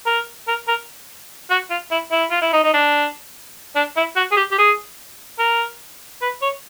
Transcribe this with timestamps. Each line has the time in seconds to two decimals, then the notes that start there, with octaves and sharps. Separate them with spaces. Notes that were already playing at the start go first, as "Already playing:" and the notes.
0.06 A#4
0.48 A#4
0.68 A#4
1.50 F#4
1.71 F4
1.92 E4
2.12 E4
2.31 F4
2.42 E4
2.53 D#4
2.64 D#4
2.74 D4
3.76 D4
3.97 E4
4.16 F#4
4.32 G#4
4.37 G4
4.52 G4
4.58 G#4
5.39 A#4
6.22 B4
6.42 C#5